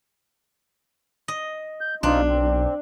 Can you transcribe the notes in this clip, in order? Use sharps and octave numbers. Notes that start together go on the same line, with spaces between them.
D#5
G6
B1 C4 D4 D#4 F4
C4